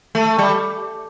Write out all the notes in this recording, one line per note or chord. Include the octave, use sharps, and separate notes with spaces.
A3
G3